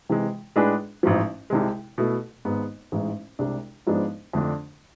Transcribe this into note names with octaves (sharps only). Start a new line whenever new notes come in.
C3 E3 G#3
A2 G#3 D4 G#4 B4
A1 G#2 F3
C2 C3 G#3
B2 A3 E4 A4
G#1 G#2 G#3 B3
A1 G#2 E3 G#3
C2 C3 G#3 D4
G#2 F3 G#3 B3 D4
F2 D3 A3 D4